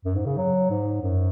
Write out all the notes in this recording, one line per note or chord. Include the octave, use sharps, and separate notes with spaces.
F#2
G#2
C#3
F#3
G#2
F#2